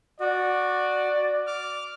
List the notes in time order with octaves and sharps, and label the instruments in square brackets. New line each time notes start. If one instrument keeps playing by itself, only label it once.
[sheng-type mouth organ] F#4 [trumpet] D5
[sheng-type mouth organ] D6 F6